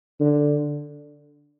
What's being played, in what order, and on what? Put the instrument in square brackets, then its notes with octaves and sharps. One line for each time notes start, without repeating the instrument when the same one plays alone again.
[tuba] D3